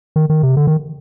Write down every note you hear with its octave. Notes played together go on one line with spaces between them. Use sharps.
D#3
D#3
C3
D3
D#3